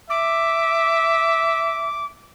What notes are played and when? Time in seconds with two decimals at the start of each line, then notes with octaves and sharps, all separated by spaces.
0.09 E5 D6